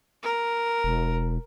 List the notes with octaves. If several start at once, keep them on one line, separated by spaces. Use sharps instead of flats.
A#4
E1